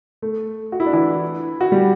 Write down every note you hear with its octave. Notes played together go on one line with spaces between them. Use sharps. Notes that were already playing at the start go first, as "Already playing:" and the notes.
A3
F#4
E4
D4
E3 E4
F#4
G3 G4